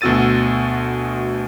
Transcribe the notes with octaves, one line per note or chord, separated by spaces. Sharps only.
D2 B2 F#4 E6 A6 D#7